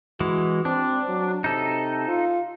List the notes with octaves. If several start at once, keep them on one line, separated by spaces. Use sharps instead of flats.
E3 G#3 F#4
C4 D4
F#3
C3 D#4 A4
F4